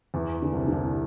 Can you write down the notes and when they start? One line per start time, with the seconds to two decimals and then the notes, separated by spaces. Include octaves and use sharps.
0.14 E2 E3
0.42 D3
0.53 C2 C3
0.67 D3
0.72 C2 C3